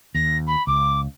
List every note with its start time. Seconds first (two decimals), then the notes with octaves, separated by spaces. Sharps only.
0.15 D#2 A#6
0.47 B5
0.67 C#2 D6